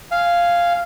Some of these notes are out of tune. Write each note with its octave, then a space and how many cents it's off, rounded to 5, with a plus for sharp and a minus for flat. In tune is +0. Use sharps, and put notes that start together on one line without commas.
F5 -5 G#5 +0